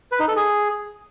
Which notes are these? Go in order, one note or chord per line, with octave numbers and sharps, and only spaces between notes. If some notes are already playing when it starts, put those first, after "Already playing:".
B4
D#4
A4
G#4